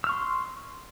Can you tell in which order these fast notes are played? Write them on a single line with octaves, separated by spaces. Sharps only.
E6 F6 C#6 C6